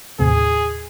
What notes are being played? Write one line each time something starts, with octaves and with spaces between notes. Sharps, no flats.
D#2 A2 C3 G#4